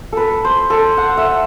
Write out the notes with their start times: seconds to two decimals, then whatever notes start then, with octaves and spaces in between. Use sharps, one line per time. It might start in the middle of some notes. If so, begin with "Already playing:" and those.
0.12 A4 B4
0.45 C5
0.70 A4
0.97 F#5
1.17 E5